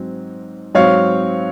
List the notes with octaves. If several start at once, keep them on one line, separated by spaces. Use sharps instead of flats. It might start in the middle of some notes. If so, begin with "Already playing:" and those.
Already playing: G#2 F#3 C4
G#2 F#3 C4 C#5 F5